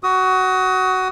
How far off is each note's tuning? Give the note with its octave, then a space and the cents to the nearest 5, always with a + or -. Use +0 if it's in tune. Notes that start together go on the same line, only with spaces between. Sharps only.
F#4 +15 D#6 +25